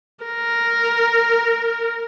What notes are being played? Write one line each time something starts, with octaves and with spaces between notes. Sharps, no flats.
A#4